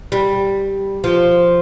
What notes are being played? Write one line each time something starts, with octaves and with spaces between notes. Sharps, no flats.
G3
F3